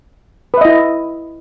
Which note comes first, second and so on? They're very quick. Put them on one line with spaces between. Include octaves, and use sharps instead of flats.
B4 E5 D#5 E4